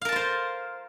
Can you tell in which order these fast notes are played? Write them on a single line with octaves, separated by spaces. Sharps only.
F5 A#4 A5 F4 C5